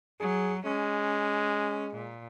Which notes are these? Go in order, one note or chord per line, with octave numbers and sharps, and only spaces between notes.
F#3 G#4
G#3 C#4
A#2